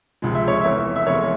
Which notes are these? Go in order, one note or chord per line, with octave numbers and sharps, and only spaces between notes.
C#2 C3 F3 G#3
E5
C#5
F1 E2 E3 E5
E5
F1 E2 E3 G#3 C#5